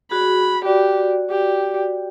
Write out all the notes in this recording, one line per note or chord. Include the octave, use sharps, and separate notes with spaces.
F#4 G#4 B5
F#4 G4 D5
G4